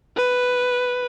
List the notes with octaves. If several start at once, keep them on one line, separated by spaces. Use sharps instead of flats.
B4